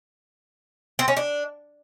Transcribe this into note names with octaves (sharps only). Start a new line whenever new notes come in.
C4
C#4
D4